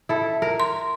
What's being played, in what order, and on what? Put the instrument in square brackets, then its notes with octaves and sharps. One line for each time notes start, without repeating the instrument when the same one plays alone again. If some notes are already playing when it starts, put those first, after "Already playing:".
[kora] E4 A4
A#4
[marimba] C6